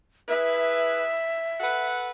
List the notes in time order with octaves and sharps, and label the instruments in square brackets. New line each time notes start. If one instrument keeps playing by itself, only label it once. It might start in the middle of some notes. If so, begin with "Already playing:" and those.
[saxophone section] E4 G#4 B4 [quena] E5
[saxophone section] A4 B4 F#5